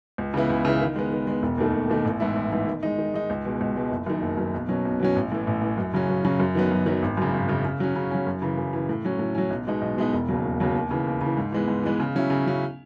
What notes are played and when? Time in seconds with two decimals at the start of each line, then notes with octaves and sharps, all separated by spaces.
0.18 C#2
0.34 C#3 E3 B3 E4
0.50 C#2
0.65 C#3 E3 B3 E4
0.80 D#3
0.96 G#3 B3
1.12 D#3
1.27 G#3 B3
1.42 E1
1.58 D#2 D#3 A3
1.74 E1
1.89 D#2 D#3 A3
2.05 A1
2.20 G#2 E3 B3 E4
2.36 A1
2.52 G#2 E3 B3 E4
2.67 D#3
2.83 G#3 D#4
2.98 D#3
3.14 G#3 D#4
3.30 C#2
3.45 B2 G#3
3.61 C#2
3.76 B2 G#3
3.91 F#1
4.06 F#2 D#3
4.22 F#1
4.37 F#2 D#3
4.54 B1
4.69 B2 F#3 C#4
4.85 B1
5.00 B2 F#3 C#4
5.16 A1
5.32 A2 E3
5.47 A1
5.62 A2 E3
5.78 F#2
5.94 C#3 F#3 C#4
6.09 F#2
6.25 C#3 F#3 C#4
6.40 F#2
6.55 D#3 F#3 B3
6.71 F#2
6.86 D#3 F#3 B3
7.02 G#1
7.17 F#2 C#3
7.34 G#1
7.48 F#2 C#3
7.65 C#3
7.80 F#3 C#4
7.96 C#3
8.11 F#3 C#4
8.26 F#2
8.42 C#3 E3
8.57 F#2
8.73 C#3 E3
8.89 A2
9.05 F#3 C#4
9.19 A2
9.35 F#3 C#4
9.50 B1
9.67 B2 G#3 B3 D#4
9.82 B1
9.97 B2 G#3 B3 D#4
10.13 E1
10.28 D#2 C#3 F#3
10.45 E1
10.60 D#2 C#3 F#3
10.75 D#2
10.91 C#3 E3
11.07 D#2
11.21 C#3 E3
11.37 G#2
11.52 E3 G#3 B3
11.68 G#2
11.83 E3 G#3 B3
12.00 C#3
12.15 F#3 C#4 E4
12.30 C#3
12.46 F#3 C#4 E4